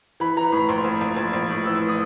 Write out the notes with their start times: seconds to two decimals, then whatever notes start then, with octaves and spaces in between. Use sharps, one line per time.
0.20 E3 B5
0.37 E3 A#5
0.52 A2 B5
0.69 A#1 C6
0.84 A#1
1.01 A#1
1.17 A#1
1.33 A#1
1.49 A2
1.65 E3 E6
1.89 D#6